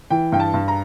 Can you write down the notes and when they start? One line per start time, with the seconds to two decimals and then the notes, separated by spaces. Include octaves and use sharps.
0.10 E3 G5
0.32 G2 G5
0.40 A5
0.54 G2
0.68 A#5